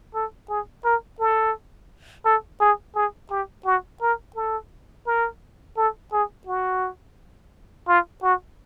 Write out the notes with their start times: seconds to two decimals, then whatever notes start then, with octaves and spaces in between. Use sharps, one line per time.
0.14 A4
0.49 G#4
0.85 A#4
1.20 A4
2.25 A4
2.61 G#4
2.95 G#4
3.31 G4
3.65 F#4
4.02 A#4
4.36 A4
5.06 A#4
5.77 A4
6.12 G#4
6.47 F#4
7.88 F4
8.23 F#4